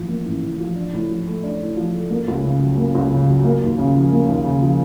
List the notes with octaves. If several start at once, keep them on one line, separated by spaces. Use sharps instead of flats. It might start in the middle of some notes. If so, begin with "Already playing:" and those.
Already playing: A1 A2 F3
A#3
A1
A2
F3
D4
A2
F3
A3
D4
A2
F3
A3
A#3
C#2
C#3
F#3
A#3
C#2
C#3
F#3
A#3
D#2
C#3
F3
A#3
D#2
C#3
F3